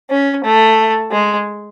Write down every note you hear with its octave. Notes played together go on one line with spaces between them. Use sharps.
C#4
A3
G#3